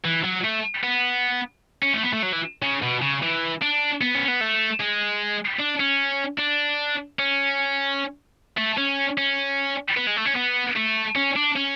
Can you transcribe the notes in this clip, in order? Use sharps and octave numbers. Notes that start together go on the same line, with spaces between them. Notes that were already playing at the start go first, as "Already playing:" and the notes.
E3
F#3
A3
B3
C#4
A3
B3
A3
F#3
E3
C#3
B2
C#3
E3
D4
B3
C#4
B3
A3
G#3
D4
C#4
D4
C#4
A3
C#4
C#4
B3
G#3
A3
C#4
B3
A3
C#4
D4
C#4